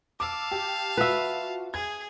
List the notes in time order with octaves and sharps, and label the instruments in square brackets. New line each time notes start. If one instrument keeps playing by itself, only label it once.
[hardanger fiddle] F5 A5 [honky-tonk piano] D6 E6
[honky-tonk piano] G4
[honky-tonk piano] F4 F#4 [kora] B4 E5
[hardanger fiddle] G#4 [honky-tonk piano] G#6